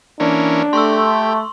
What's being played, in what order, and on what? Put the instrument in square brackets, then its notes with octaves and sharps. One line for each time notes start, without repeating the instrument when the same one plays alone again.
[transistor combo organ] E3 A#3 C#4 [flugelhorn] D4
[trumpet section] A3 [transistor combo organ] G4 [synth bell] C6 C#6 E6